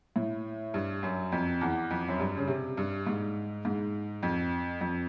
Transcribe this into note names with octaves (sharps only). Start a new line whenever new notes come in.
A2
G2
F#2
F2
E2
F2
F#2
G2
C#3
C3
G2
G#2
G#2
F2
F2